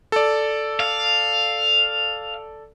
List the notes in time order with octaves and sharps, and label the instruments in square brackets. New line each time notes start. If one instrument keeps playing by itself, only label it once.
[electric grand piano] A4 D5
[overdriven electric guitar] F5